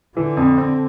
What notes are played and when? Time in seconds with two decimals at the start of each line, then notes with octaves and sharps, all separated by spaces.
0.16 D3 E3
0.37 F2
0.58 C4